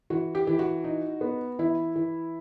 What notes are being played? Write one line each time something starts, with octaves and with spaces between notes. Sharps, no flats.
E3 F#4
G4
E3
F#4
D#4
B3
E3 E4
E3